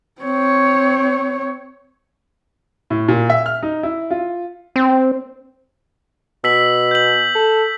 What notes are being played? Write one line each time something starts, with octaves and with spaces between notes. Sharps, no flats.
C4 C#5
A2
A#2
E5
F6
D#4
E4
F4
C4
B2 E6 B6 F#7
G6 F#7
A4